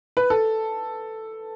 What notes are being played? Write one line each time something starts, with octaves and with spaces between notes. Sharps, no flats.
B4
A4